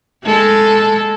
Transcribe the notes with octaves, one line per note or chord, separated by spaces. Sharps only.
G#3 A4